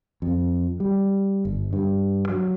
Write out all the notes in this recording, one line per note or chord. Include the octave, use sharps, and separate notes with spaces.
F2
G3
G1
G2
F#3